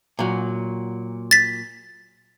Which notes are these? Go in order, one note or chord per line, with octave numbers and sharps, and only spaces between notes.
A#2 F#3
A6 B6